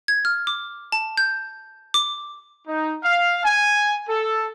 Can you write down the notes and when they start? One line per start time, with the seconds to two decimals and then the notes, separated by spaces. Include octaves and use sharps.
0.08 G#6
0.25 F6
0.47 D6
0.92 A5
1.18 G6
1.94 D6
2.68 D#4
3.04 F5
3.44 G#5
4.09 A4